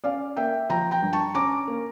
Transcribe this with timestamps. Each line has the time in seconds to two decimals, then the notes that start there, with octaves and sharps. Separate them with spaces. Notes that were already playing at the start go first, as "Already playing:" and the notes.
0.04 C#4 D5 F5
0.37 A#3 E5 G5
0.69 F3 G5 A#5
0.91 G5 A#5
1.02 G2
1.13 A5 C#6
1.34 C#4 A#5 D6
1.68 A#3